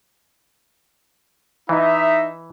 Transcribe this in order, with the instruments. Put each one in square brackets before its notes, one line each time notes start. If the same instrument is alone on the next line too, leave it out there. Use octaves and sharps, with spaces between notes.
[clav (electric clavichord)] E3 [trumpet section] D#4 E5